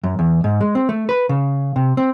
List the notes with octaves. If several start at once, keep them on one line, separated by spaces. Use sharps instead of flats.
F#2
E2
G#2
G#3
C4
A3
B4
C#3
C3
C4